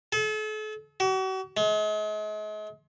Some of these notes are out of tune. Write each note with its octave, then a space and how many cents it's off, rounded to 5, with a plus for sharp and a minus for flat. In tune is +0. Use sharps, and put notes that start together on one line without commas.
A4 -40
F#4 +40
G#3 +40